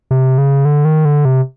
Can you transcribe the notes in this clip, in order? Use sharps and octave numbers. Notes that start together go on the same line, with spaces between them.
C3
C#3
D3
D#3
D3
C3